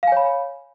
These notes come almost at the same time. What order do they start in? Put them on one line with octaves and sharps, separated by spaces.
F5 G#5 C#5 B5